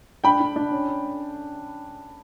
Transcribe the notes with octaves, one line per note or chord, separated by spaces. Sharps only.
D4 G5 B5
D4
D4
C#4
C#4